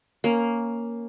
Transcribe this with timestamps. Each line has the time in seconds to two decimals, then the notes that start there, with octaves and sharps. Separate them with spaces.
0.24 A#3 C#4